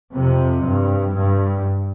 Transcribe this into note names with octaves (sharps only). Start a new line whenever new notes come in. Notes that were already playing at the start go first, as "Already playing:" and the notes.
F2 C3
G2
G2